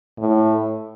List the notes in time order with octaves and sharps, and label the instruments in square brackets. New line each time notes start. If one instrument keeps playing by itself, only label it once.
[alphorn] A2